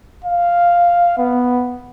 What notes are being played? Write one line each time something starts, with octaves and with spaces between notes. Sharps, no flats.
F5
B3